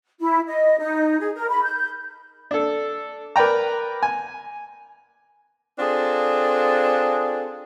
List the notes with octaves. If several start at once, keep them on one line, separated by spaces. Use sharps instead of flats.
E4
D#5
D#4
G#4
A#4
B5
G6
D4 A4
A#4 B4 D5 G5 A#5
G#5
C4 D4 F4 G#4 A4